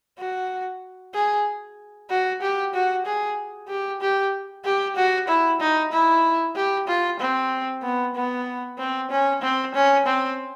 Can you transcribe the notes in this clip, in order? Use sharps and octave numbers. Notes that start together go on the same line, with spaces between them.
F#4
G#4
F#4
G4
F#4
G#4
G4
G4
G4
F#4
E4
D#4
E4
G4
F4
C4
B3
B3
C4
C#4
C4
C#4
C4